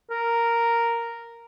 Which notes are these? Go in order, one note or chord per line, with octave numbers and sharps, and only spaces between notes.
A#4